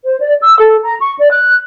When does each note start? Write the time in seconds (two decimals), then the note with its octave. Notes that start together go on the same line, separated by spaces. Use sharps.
0.02 C5
0.20 D5
0.41 E6
0.58 A4
0.83 A#5
0.98 C#6
1.18 D5
1.31 F#6